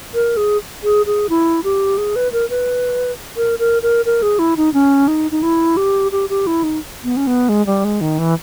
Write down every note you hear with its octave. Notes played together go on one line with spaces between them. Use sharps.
A#4
G#4
G#4
G#4
E4
G4
G#4
B4
A#4
B4
A#4
A#4
A#4
A#4
G#4
E4
D#4
C#4
D#4
D#4
E4
G4
G4
G4
E4
D#4
B3
C#4
B3
G#3
G3
G#3
D#3
E3